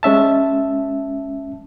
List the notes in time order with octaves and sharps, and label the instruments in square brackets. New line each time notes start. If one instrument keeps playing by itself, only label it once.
[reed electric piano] G#3 C#4 E5 A5